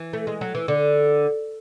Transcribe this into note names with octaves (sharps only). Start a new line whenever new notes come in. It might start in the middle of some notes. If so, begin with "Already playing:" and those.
Already playing: E3
A3
G#3
F#3
E3
D3